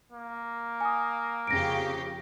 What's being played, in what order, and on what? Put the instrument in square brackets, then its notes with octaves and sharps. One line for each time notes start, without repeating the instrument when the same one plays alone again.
[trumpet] A#3
[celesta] G#5 D#6
[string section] F2 C#3 G4 [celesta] A#6 D7